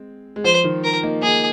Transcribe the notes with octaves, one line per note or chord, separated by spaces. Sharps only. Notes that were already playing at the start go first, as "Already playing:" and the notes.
Already playing: G#3 C4
G#3
F3 C5
D#3
A#4
A#3 D#4
A#3 D#4 G#4